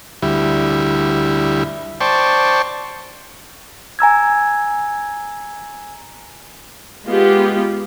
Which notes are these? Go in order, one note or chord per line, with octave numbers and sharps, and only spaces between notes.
D2 G3 E4
C5 D5 G5 A5 C#6
G#5 A#5 E6 G#6
G#3 B3 F4 G4